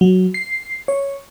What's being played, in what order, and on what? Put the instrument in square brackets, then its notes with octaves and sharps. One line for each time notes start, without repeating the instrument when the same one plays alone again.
[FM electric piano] F#3
C7
C#5